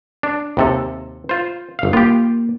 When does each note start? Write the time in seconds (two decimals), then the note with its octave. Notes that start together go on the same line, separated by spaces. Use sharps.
0.23 D4
0.57 D#2 C3 A4
1.29 F4 C5
1.79 G1 F5
1.93 A#3 F4 G4